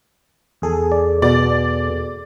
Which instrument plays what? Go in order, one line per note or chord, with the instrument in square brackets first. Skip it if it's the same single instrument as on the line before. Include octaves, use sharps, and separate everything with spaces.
[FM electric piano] E2 G#4 A4
[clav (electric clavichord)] D5
[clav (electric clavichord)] B2 [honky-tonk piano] D5